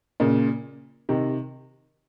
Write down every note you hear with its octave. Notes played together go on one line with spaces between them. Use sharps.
A#2 C#3
C3 D#3